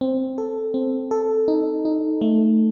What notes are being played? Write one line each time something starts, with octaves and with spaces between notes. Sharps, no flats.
C4
A4
C4
A4
D#4
D#4
A3